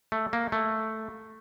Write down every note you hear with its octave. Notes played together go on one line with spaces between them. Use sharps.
A3
A#3
A3